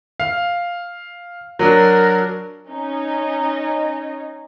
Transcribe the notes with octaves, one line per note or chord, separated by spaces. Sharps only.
F5
F#3 D4 A#4
C#4 D#4 D#5